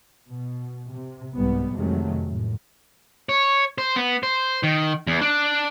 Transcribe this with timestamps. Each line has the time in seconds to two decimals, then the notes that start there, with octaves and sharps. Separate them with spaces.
0.29 B2
0.90 C3
1.35 C2 G#2 G3 B3
1.74 F2 C3 D#3 F#3 G#3 A3
2.23 F#2 A2
3.29 C#5
3.78 C5
3.96 B3
4.23 C5
4.63 D#3
5.07 E2
5.21 D4